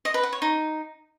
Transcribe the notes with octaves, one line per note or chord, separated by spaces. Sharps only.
D#5
B4
F#5
C#5
D#4